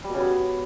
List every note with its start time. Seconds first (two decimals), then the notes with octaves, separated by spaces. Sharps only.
0.04 G3
0.09 B2
0.14 C#3
0.19 B3